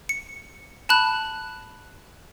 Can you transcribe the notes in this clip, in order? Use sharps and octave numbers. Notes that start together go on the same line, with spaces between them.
C#7
A5 B5 F#6